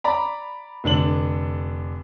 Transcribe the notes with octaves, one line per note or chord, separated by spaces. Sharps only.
D5 A#5 B5
F1 D3 D4 F#7